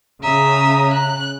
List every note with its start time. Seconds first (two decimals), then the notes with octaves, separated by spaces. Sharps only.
0.24 C#3 E5 A#5 D#6
0.94 F#6